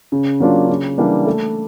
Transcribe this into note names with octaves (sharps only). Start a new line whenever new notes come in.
C#3
F#3 A#3 D4 F4
C#3
E3 G3 A#3 D4
A3